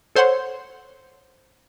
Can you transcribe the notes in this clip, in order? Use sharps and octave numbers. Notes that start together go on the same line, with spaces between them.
A4 C5 C#5 F#5 C6